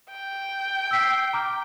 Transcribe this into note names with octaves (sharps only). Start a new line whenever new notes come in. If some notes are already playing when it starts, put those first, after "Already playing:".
G5
E6 B6 C7
A#5 D6 F6